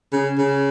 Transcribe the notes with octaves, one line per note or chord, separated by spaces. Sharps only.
C#3
C#3